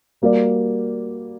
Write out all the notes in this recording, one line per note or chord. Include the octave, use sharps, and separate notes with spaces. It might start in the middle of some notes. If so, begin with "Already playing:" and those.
G3 A#3 F#4 A#4 D5